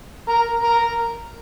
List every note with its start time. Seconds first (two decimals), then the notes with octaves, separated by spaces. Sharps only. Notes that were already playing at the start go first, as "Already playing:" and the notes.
0.29 A#4
0.64 A#4